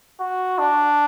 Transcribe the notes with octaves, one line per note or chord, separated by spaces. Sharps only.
F#4
D4